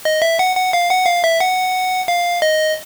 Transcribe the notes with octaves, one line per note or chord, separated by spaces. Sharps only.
D#5
E5
F#5
F#5
F5
F#5
F5
E5
F#5
F5
D#5